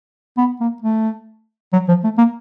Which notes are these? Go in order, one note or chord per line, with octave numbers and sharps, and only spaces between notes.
B3
A#3
A3
F#3
F3
A3
A#3